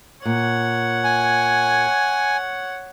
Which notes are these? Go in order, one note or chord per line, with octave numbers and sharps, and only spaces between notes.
A#2 C#5 F#5
G#5